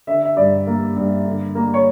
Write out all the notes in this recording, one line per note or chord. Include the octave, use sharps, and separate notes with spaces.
D3 E5
E5
G2 D5
A#3
G2
D3
A#3
C#5